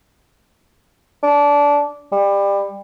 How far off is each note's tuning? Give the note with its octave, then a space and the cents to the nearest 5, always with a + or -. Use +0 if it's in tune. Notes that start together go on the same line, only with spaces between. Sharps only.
D4 -20
G3 +25